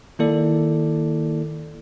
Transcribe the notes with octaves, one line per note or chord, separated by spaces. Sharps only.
D#3 A#3 E4 A4 D5